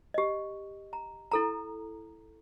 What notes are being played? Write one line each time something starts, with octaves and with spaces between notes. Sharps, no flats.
G4 D#5
A#5
E4 A4 A#5